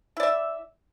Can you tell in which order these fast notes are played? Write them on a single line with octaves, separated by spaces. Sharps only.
E4 D5 E5